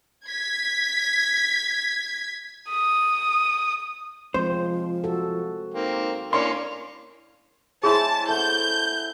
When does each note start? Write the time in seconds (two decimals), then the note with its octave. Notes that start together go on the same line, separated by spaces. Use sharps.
0.24 G#6 B6
2.70 D#6
4.34 F3 G#3 C4 C5
5.04 F#4 A4
5.74 A#3 C4 D#4
6.33 A#3 C#4 D4 E4 C#5 D5 C6
7.83 G#3 E4 G#4 C5 C#5 A5 C6
8.28 A3 F#5 G6